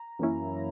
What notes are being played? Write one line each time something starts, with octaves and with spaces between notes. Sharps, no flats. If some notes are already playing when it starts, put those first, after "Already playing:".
Already playing: A#5
F#2 E3 A#3 C#4 E4